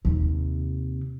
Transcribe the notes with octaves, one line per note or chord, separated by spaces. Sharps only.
D#2 C3